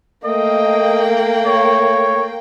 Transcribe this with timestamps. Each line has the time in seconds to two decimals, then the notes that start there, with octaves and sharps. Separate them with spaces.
0.25 A3 A#3 D#5 G5
1.46 C#5